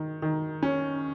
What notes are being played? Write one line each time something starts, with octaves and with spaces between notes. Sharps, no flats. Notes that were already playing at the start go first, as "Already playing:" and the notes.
Already playing: D#3
D#3
C#4